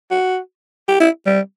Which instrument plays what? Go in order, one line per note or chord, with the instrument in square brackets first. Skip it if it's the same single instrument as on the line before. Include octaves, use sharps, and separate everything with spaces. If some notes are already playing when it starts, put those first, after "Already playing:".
[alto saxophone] F#4
G4
E4
G3